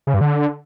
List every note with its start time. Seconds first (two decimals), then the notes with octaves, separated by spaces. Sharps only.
0.07 C#3
0.14 G2
0.21 D3